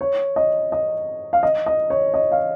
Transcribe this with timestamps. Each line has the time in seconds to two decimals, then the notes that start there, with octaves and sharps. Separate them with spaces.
0.01 C#5
0.36 D#5
0.72 D#5
1.33 F5
1.43 D#5
1.66 D#5
1.90 C#5
2.14 D#5
2.32 F5